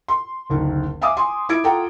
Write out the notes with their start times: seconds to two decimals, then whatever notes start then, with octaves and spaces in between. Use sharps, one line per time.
0.08 C6
0.50 F#1 D2 D#3
1.01 E5 F5 G#5 D6 D#6
1.17 G#5 C6
1.49 E4 G#6 D7
1.64 F4 A4 F#5 G5 A#5